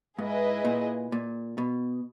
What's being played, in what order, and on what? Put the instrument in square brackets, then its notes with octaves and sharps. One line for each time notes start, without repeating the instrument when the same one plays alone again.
[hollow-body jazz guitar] G#2 [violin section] E4 G#4 B4 D#5
[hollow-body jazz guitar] A#2
A#2
B2